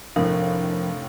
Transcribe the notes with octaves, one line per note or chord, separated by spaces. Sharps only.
F1 A2 F3 D4 A#4 F5